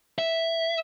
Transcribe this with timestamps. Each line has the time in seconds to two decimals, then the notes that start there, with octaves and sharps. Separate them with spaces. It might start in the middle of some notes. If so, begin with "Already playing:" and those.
0.19 E5